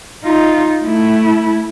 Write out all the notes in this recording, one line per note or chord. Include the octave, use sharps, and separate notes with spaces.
D#4 F4
A3 E4